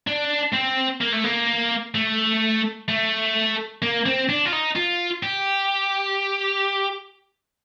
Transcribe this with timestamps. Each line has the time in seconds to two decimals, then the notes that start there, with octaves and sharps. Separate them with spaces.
0.07 D4
0.54 C4
1.01 A#3
1.12 A3
1.24 A#3
1.95 A3
2.88 A3
3.82 A#3
4.06 C4
4.29 D4
4.45 F4
4.53 D#4
4.76 F4
5.23 G4